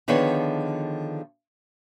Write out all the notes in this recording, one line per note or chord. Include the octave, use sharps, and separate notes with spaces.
D3 D#3 F3 B3 G#4 C#5